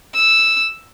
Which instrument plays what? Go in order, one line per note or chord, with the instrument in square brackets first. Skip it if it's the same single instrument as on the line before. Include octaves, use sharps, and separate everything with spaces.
[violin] E6